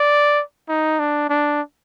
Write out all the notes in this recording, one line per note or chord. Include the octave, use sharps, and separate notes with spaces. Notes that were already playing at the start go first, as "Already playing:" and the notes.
Already playing: D5
D#4
D4
D4